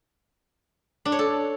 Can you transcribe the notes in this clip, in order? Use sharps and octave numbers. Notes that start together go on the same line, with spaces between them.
D4
C#5
A4